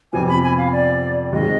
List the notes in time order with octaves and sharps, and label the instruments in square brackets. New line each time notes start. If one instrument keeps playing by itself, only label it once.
[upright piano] F2 C3 F3 B3 [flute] G#5
[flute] B5
G#5
F5
D5
[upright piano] D#2 D#3 G#3 C4 [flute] D#5